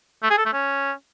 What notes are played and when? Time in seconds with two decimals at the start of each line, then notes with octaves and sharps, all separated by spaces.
0.23 A3
0.30 G#4
0.38 A4
0.45 A3
0.53 C#4